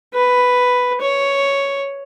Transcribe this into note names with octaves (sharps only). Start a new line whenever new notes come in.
B4
C#5